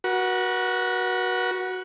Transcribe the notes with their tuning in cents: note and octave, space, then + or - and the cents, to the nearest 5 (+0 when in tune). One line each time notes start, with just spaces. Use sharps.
F#4 +0 B4 -45